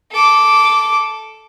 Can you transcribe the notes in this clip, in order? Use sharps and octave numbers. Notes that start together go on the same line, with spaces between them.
A4 D6